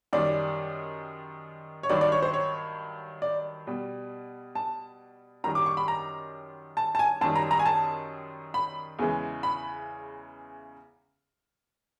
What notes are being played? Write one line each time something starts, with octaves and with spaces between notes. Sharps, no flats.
F#2 D#3 G3 D5
C#5
G2 D#3 F#3 D5
D5
C#5
C5
C#5
D5
B2 G3
A5
F#2 D#3 G3 A#5
D6
C#6
B5
A#5
A5
A5
G#5
F#2 D#3 G3 A5
A#5
A#5
G#5
A5
B5
E2 C#3 E3 G#3
B5